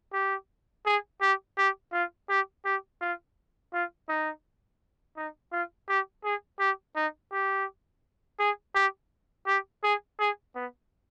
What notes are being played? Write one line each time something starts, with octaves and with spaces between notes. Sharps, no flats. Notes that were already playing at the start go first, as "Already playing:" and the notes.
G4
G#4
G4
G4
F4
G4
G4
F4
F4
D#4
D#4
F4
G4
G#4
G4
D#4
G4
G#4
G4
G4
G#4
G#4
B3